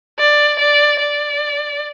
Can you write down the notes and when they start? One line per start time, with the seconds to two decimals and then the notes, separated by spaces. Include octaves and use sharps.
0.19 D5
0.59 D5
0.99 D5